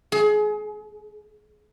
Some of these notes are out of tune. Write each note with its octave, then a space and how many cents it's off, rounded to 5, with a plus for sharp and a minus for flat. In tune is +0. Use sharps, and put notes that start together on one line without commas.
G#4 +30